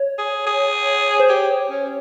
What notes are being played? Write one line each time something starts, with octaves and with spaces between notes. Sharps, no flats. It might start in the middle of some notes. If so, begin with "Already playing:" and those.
Already playing: C#5
G#4
G#4
C5
G4 C#5
C#4